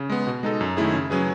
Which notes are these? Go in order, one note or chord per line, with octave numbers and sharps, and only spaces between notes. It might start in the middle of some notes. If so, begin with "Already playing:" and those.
Already playing: C#3
G#3 B3
B2
G#3 D#4 A4
F#2
D#3 A3 E4 G#4
C#3
F#3 C#4 G#4 B4